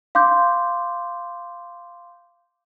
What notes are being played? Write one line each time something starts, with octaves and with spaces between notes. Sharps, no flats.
F5 C6 D6 G6